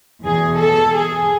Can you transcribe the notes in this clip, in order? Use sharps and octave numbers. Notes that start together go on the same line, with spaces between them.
E2 B2 G#4
A4
G#4